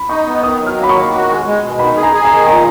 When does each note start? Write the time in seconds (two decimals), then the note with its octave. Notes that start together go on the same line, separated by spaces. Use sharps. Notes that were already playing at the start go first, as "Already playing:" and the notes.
Already playing: B5
0.09 D#4 C#6
0.26 B3
0.43 D#3 D#6
0.60 F#3
0.67 F6
0.77 A#3
0.83 B5
0.89 D#3 C#6
1.12 F#4
1.29 G#3
1.46 G#3
1.63 B2
1.79 D#3 B5
1.97 G#4
2.03 A#5
2.13 G#4
2.25 A#5
2.31 D#3
2.48 A#2 A#5